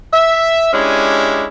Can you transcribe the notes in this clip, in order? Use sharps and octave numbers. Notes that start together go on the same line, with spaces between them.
E5
G#3 C#4 D4 E4 G4